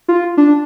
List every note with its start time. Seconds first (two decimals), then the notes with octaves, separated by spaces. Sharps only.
0.08 F4
0.37 D4